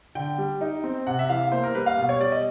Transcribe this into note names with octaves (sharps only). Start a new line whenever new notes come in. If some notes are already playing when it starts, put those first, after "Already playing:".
D3 G5
G3
D#4
C4
C3 F#5
E5
E3 F5
A#3 C5
A#4
G3 B4
F5
B2
C#5
G3 D5
D#5